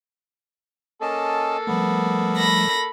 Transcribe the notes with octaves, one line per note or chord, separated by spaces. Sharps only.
A#3 C#4 A4 D#5 A5
F3 G3 A3 B3
B5 A#6